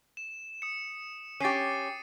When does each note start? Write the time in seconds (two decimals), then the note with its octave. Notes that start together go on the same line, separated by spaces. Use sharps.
0.17 E7
0.62 D#6 C#7
1.40 C#4 G4 A6 C7 D#7